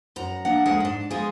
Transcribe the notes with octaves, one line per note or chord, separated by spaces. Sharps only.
F#2 F#5 A#5
A#3 D4 F#5
D2 G#3 G#4 A#4 F#5
G#2 D4
F3 G#3 B3 F4 G#4